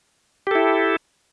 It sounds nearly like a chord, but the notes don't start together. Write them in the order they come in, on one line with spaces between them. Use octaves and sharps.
G4 A4 E4